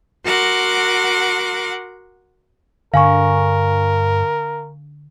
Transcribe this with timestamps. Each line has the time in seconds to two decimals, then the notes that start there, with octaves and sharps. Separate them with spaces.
0.23 F#4 A#4 F#5 C6 D6
2.94 G2 D3 A#4 F5 G#5 C#6